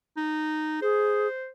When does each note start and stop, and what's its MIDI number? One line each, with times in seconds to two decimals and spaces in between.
0.17 0.81 63
0.82 1.28 68
0.82 1.49 72